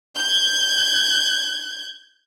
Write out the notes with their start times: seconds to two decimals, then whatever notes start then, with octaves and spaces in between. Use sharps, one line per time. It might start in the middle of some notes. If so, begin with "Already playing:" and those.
0.18 G6 G#6